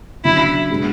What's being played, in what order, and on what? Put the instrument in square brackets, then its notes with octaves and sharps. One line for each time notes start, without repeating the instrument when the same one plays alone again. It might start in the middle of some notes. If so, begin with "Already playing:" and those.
[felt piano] C#3 F#3 B3 D4 [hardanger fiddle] E4
[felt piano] B2 G#3 B3 D4 G#4